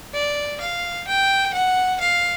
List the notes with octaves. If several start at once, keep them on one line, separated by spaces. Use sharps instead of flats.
D5
F5
G5
F#5
F5